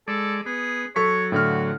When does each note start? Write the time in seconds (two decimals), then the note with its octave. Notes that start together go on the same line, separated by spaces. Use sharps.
0.08 G#3 A4 D5
0.46 B3 G#4
0.96 F#3 A4 C#5 C#6 B6
1.32 A2 D3 F#4 F6